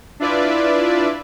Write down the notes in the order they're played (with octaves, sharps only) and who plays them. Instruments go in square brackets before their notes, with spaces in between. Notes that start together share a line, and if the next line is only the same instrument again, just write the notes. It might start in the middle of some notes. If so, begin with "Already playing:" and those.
[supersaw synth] D4 E4 F4 B4 D5 E5